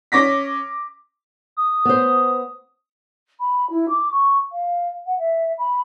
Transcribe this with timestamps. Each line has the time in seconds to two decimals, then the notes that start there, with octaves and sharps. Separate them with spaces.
0.12 C#4 D6 A#6 B6
1.57 D#6
1.85 B3 C5
3.40 B5
3.70 E4
3.89 D6
4.11 C#6
4.52 F5
5.06 F#5
5.19 E5
5.58 B5